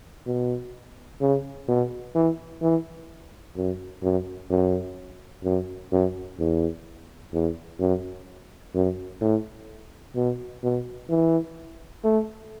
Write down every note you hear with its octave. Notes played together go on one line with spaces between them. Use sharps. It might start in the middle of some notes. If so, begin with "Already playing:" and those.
B2
C#3
B2
E3
E3
F#2
F#2
F#2
F#2
F#2
E2
E2
F#2
F#2
A2
B2
B2
E3
A3